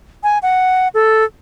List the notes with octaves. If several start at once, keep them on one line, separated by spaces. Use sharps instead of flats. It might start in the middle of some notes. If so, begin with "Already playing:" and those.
G#5
F#5
A4